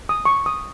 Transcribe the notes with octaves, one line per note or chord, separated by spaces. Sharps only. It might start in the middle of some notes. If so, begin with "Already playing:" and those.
D#6
C#6
D#6